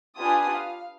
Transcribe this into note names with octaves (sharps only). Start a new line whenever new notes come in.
D4 F4 G4 B4 G#5 D#6
F5